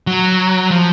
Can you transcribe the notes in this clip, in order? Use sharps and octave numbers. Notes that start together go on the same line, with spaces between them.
F#3
F3